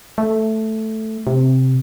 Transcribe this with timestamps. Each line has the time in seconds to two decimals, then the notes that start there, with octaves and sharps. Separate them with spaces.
0.18 A3
1.27 C3